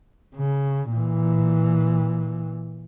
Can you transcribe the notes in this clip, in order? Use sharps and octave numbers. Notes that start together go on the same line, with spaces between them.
C#3
A#2 E3